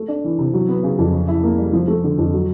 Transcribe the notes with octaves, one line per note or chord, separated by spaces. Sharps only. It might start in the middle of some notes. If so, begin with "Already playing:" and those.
Already playing: A3
D4
E3
C3
F#3
B3
C#3
F2
C#4
E4
A#3
G3
F3
A3
D3
F2
F#3